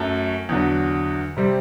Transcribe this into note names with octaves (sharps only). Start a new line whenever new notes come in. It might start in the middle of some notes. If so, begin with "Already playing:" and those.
Already playing: F#2 F#3 A3
E2 D3 F#3
C3 G3 C4